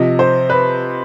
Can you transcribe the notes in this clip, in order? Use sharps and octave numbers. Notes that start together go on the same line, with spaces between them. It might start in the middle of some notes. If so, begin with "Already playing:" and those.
Already playing: C3 F3 D#5
C5
B4